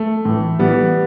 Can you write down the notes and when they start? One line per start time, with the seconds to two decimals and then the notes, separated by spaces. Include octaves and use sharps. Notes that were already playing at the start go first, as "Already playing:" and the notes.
Already playing: A3
0.25 A2 E3
0.59 A2 E3 G3 B3